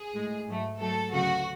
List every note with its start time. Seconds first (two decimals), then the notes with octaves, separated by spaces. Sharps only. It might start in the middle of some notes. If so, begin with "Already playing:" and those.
Already playing: G#4
0.14 A2 G#3
0.48 G#2 F#3 A3
0.80 G#2 F#3 A3 A4
1.12 D2 C#3 F#3 A3 F#4